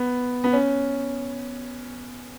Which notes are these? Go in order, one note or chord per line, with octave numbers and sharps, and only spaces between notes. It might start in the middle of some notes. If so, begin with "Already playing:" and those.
Already playing: B3
B3
C#4